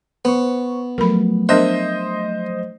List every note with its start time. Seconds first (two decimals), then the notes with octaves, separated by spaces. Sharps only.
0.25 B3 C5 C#6
0.98 F3 F#3 A3 A#4 B5
1.49 B3 D4 A#4 C5 D#5 E5